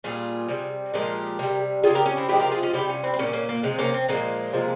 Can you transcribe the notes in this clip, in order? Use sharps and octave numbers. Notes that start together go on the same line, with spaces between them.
A#2 G3 F4 G#4
C3 G3
A#2 F3 G#3 G4 A#4
C3 G3
C#3 G3 F4 G#4
G4 A#4
C#4 F4
C4 E4
C3 F3 G#3 E4 G4
G4 A#4
F4 G#4
C#4 F4
C3 G3 E4 G4
C#4 F4
C4 E4
C4
A#2 G3 A#3 C#4
A#3 C#4
A#3
C3 F3 G#3
A#3 C#4
C4
A#2 F3 G#3 A#3
C3 F3 G#3